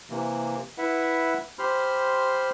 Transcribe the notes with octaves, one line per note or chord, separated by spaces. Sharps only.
C3 E3 A#3
E4 B4 E5 F#5
G4 C5 B5 C6 F6